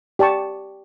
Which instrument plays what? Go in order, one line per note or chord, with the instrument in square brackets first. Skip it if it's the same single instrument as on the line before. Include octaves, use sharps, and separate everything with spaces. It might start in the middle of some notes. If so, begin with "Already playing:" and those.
[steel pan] G4 D5 A5 C#6